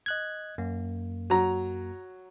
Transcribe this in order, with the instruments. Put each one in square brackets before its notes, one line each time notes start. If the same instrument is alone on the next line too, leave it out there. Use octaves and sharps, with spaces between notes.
[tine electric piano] D#5 F#6 G#6
F#2 A#3
[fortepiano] F#3 A#5